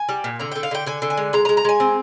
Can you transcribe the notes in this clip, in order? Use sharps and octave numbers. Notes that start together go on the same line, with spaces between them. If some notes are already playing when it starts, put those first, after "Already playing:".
Already playing: G#5
G3
A#2
D3 A#5
D3 G5
F5
D3 G5
D3 G#5
D3
G#5
G#3
G#3 A#5
A#5
G#3
A#5
G#3 G#5
C4